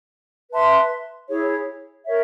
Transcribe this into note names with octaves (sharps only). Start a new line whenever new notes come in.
B4 E5 A5 C6
E4 G#4 C#5
A#4 C#5 E5